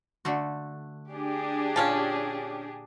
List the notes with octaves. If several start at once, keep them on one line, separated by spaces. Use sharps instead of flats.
D3 A3 F#4
D4 G4 G#4
A#2 C#4 F4 A5